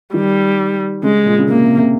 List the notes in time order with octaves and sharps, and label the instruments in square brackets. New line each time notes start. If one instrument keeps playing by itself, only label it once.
[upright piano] D#3 [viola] G3
[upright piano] C#3 [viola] G#3
[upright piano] A#2
C#3
[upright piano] C3 [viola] A#3
[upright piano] C3
C3